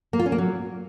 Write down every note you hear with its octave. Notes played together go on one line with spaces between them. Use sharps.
A#3
F4
C#4
A#3
F#3